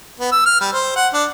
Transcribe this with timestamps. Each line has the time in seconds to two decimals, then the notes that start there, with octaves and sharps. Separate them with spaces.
0.20 B3
0.32 E6
0.46 F6
0.61 G3
0.73 C5
0.96 F#5
1.13 D4